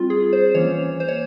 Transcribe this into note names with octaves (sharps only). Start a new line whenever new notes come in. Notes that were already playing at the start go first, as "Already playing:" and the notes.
Already playing: G3 C4 F4
G#4
C5
E3 A#3 C#4 C#5
C5
C#5